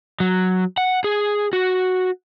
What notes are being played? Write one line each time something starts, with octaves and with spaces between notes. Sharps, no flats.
F#3
F#5
G#4
F#4